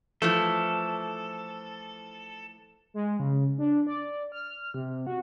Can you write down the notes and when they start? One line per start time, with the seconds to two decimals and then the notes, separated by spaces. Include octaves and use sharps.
0.22 E3 F3 A3 A4
2.94 G#3
3.20 C#3
3.58 D4
3.87 D5
4.32 F6
4.74 C3
5.07 F#4